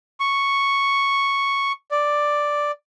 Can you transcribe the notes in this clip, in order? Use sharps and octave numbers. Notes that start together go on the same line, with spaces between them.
C#6
D5